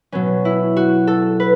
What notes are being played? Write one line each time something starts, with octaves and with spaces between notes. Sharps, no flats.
B2 F#3 B3 C#4
E4
F#4
A4
B4